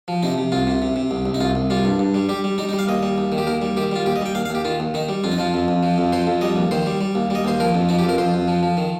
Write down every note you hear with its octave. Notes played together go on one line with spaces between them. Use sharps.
F3
C3 D#4
C3
C2 F4
C3
C3
C3
C2
C2
D#4
C2 F4
C2
G3 F4
G2
G2
G3
G3 G4
G3
G3 D#4
D#4
G3
F5
D#2 D#5
G3
D#2
D#3
G4
D#2 A#4
G3
D#3 G4
G3 F4
D#2 G4
D#5
G3 G5
D#2 F5
F5
D#2 G4
D#3 F4
D#2
D#3 D#4
G3
F2 F4
D#4
F3 F4
F2
F2
F3
F2
F3 C5
F2
G3 D#5
D#2
D#3 C5
G3
G3
D#2
G3 D#5
D#2 C5
F3 A#4
F2
F3 D#4
G4
F2 A#4
F2 C5
F2
F3
F3
D#3